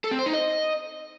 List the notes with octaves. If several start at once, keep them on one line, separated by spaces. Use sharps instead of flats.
A4
C4
C5
D#4
D#5